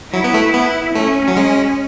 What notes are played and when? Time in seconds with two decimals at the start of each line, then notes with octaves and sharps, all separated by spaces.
0.13 F#3 E4
0.24 B3
0.34 A3
0.54 B3
0.95 A3 C#4
1.28 F#3
1.37 G#3